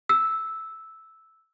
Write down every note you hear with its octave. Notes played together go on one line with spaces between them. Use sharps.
E6